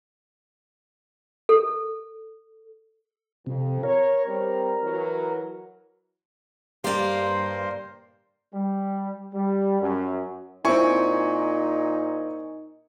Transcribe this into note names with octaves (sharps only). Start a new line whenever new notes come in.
A4
F2 C3
A#4 C#5
G3 C4
E3 F#3
G2 A#3 G4 A#4 C5 D5 F5 C6
G3
G3
F#2
A#2 C4 D#4 E4 G#5 C#6